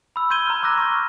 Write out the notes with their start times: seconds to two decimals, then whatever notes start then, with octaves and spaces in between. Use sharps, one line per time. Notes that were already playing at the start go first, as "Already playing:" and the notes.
0.16 B5 E6
0.30 C6 G6 G#6 D#7 G7
0.47 A#5 F6
0.63 A#5 D6 E6 F#6 A#6
0.78 C#6 F6 G6